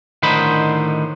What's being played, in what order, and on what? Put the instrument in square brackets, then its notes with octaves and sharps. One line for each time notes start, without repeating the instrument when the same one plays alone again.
[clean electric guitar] A2 D3 D#3 D#4 C5 B5